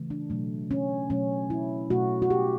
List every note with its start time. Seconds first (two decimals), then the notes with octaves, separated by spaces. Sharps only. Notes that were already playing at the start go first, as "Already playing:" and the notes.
Already playing: C#3 E3 A3
0.10 D4
0.30 B2 F#3 A3
0.71 C#4
1.10 B2 F#3 A3 C#4
1.50 E4
1.90 B2 A3 F#4
2.22 F#4
2.30 G4